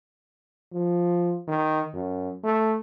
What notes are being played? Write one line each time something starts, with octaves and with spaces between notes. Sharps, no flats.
F3
D#3
F#2
A3